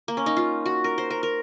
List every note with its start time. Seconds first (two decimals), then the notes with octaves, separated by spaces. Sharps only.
0.08 A#3
0.17 C#4
0.26 D#4
0.37 F4
0.66 F#4
0.84 A#4
0.98 C5
1.10 A#4
1.23 A#4